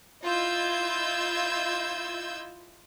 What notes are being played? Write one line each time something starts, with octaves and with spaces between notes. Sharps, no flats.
E4 F4 D#5 E6 G6 G#6